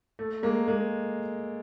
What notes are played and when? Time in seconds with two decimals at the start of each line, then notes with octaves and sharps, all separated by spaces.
0.19 A3
0.43 G#3 A#3
0.68 G#3 A#3